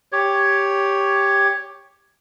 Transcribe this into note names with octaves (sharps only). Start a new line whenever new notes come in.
G4 C#5